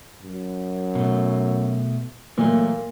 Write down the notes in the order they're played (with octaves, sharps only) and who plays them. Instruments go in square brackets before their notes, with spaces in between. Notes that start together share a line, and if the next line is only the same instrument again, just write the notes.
[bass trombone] F#2
[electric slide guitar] B2 A3
[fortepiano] A#2 [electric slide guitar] E3 F#3 A3 [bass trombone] A#3